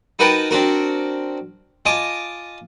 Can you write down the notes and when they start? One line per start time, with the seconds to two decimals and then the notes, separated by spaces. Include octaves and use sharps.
0.19 D#4 F#4 A#4 B4 G5 A5
0.51 C4 D4 F#4 A#4
1.85 F4 D#5 G#5 A5 D6